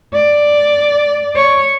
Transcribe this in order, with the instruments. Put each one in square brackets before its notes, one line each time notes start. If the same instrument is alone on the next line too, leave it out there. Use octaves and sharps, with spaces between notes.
[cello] D5
C#5